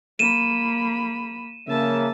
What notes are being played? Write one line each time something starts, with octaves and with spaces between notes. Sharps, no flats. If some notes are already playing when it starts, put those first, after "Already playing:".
A#3 B5 D#7 E7
C#3 A#3 E5 A5